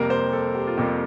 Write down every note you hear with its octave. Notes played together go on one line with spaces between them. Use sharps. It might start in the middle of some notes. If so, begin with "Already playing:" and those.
Already playing: F2 C3 G3 A#3 A#4
C5
A4
G4
F4
F2 C3 G3 A#3 G4